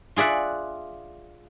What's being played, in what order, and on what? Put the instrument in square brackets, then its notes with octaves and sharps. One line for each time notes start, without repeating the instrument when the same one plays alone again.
[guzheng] F4 G#4 D5 E5 F#5